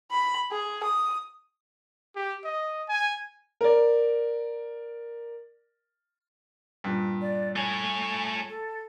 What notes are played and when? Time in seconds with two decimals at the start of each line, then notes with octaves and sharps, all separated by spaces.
0.11 B5
0.52 G#4
0.84 D#6
2.16 G4
2.45 D#5
2.89 G#5
3.61 A#4 D5
6.84 G2 A#2
7.21 D5
7.56 A3 C#5 G#5
8.48 A4